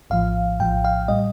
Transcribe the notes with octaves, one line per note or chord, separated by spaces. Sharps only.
A#1 A2 F3 F5
A#1 A2 F3 G5
F5
A2 G3 D#5